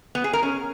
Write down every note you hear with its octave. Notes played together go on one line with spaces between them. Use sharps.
B3
G#4
A#4
C#4